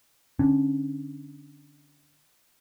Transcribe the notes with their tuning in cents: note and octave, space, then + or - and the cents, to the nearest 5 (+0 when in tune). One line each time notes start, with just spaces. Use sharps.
D3 +0 C#4 -25